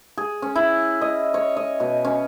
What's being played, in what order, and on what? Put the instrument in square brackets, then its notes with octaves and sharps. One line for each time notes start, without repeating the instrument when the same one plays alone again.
[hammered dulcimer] G#4
C#4
E4
D#5
C#5
D#5
B2
C#4